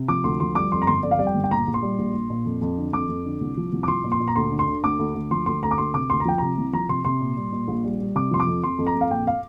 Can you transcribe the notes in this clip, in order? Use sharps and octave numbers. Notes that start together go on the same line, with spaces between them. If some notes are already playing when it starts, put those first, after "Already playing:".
Already playing: C3
F3 D6
D2 C6
F3 C6
G3 D6
F2 C6
A#5
G1 C6
F2 D5
F5
G3 D5
G5
G1
G5
A#1 A#5
A#1
C6
G3
A#1
A#1
A#2
F2
F2
D3
F2 D6
F2
D3
C2
F3
C2
D6
F3 C6
A#2
C6
A#2
A#5
D2 C6
D3
C6
D3
D2 D6
D2
D2
F3 C6
D2 C6
D2 A#5
D6
D2 C6
C3 D6
D2 C6
A#5
F3 G5
C3 A#5
C2
F3 A#5
C3 C6
C3 C6
A#2
G3
A#2
A#1
G3
G3
C3 D6
F3 C6
D6
F2
F2 C6
F2
A#5
F2
F5
A#1 G5
F5